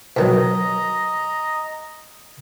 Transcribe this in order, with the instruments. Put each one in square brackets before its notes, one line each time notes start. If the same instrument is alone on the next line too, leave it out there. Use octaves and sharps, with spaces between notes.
[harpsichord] B2 D#3 F#3 [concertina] D#5 A#5